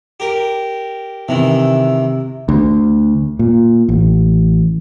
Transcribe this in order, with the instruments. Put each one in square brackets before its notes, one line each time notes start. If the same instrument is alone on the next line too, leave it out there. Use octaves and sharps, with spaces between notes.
[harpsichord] G4 A#4
[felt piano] C3 [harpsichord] D#3 E3
[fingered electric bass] D2
A#2
A1